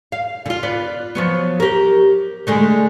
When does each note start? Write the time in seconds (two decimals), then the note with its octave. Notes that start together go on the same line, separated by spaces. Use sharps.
0.12 F5
0.46 D3 F4
0.63 B3 B4 D5
1.15 F3 F#3 B3
1.60 G4 A#4
2.47 D3 G#3 A3